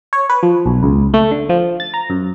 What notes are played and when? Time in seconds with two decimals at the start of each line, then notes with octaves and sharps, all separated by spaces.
0.13 C#5
0.29 B4
0.43 F3
0.66 B1
0.83 C#2
1.14 A3
1.31 D3
1.49 F3
1.80 A6
1.94 A#5
2.10 F#2